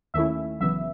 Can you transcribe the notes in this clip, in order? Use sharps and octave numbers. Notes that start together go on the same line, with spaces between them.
D#2 D#3 A3 C#4 E4 E5
G#1 F#2 C#3 E3 B3 E5